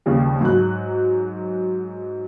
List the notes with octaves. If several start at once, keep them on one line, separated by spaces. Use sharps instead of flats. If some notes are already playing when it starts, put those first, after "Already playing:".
D#2 C#3 F3 G3
G#2 F#3 F#6